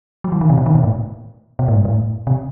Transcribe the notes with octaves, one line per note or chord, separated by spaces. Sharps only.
F#3
E3
D#3
C3
B2
D#3
B2
A2
B2
A2
G2
A2
C3